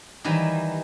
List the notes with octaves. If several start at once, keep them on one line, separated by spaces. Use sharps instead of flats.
D#3 E3 F#3 G3